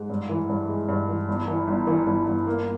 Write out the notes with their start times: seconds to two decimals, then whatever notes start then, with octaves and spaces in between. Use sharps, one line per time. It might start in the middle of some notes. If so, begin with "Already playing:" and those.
Already playing: G#2
0.10 G2
0.29 E3
0.49 G2
0.69 G#3
0.89 G2
1.08 E3
1.28 G1
1.48 E3
1.67 G1
1.87 E3
2.06 G1
2.26 G1
2.47 A#3